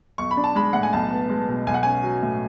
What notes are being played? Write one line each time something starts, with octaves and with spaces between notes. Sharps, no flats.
B1 C#6
B5
D4
A5
G#3 B5
A2 F#5
G#5
B1 A5
B3
G#3
B2
B1 G#5
F#5
C#4 G#5
F#3
A2